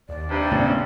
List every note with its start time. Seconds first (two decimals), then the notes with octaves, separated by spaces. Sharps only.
0.09 D#2 D5
0.29 G2 C3
0.51 A2 C#3 B3 C#4